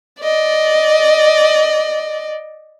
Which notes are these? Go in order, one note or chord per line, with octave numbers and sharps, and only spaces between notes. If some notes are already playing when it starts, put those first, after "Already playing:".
D5 D#5